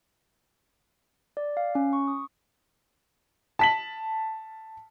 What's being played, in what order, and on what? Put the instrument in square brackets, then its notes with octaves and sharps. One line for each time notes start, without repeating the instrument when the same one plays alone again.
[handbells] D5
F5
C#4
C#6
D#6
[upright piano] A5 B6 F#7